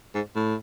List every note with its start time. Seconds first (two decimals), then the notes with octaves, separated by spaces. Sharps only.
0.15 G#2
0.35 A2